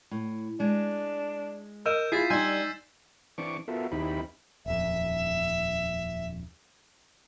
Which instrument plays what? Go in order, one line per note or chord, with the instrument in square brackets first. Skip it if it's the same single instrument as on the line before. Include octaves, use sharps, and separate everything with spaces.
[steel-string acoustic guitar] A2
[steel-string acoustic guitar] G#3 [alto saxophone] D4
[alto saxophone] A#4 [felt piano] D#5 E6 [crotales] G6 D#7 E7
[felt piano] E4 F4 [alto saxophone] G#4 [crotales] A6 B6 C7
[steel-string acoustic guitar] G3 D4 [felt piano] D#4 C6 [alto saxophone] G#5 [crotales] E6 G6 D#7
[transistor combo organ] E3 C4 D4 C#6 D6
B3 F4 F#4 A4 A#4 E5
D#2 C4 D#4 E4 G4 B5
[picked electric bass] D#1 F2 [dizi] E5